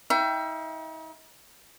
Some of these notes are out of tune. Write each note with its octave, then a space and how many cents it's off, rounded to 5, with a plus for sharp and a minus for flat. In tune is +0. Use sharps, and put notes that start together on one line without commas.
D#4 +45 E5 +30 G5 +0